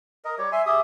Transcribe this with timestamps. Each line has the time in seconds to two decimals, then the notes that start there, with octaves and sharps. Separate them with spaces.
0.25 A#4 D#5
0.38 G3 G4 C#5
0.52 E5 G#5 C6
0.66 G4 G#4 E5 D#6